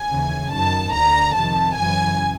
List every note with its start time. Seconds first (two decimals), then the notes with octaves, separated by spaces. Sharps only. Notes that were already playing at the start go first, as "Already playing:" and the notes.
Already playing: G#5
0.10 D#2 C#3 E3
0.52 F#2 D#3 A5
0.93 D2 D3 A#5
1.35 F2 C3 D#3 A5
1.76 F#2 C#3 E3 G#5